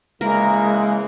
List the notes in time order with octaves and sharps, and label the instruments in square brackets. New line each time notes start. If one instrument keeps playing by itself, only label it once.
[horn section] C#3 E3 A#3 [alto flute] G#3 [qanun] A#4